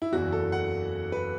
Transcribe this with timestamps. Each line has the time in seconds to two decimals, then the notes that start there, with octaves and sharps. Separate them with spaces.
0.02 E4
0.12 F#1 E2 E3 F#4
0.32 A4
0.52 F#5
1.12 B4